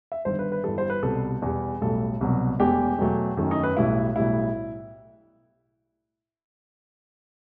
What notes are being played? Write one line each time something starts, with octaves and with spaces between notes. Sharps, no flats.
E5
G1 G2 D#3 C5
B4
B4
G1 G2 E3 G3 A4
C5
B4
C2 B2 G3 A4
E2 B2 G3
B1 A2 G3 A4
C2 B2 F#3
E1 E2 B2 A3 G4
E2 B2 F#3 A3
F#2 D#3 A3
D#4
B4
B1 A2 G3 E4
B1 A2 G3 E4